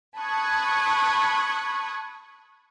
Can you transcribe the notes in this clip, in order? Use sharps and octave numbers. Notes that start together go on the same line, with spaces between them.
A5 B5 C#6 D#6 F#6 G#6